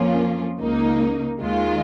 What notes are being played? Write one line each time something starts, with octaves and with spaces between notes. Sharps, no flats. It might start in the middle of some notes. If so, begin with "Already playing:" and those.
Already playing: F2 F3 A#3 C#4 F4
C#2 C#3 A#3 D#4
D#2 D#3 G#3 F4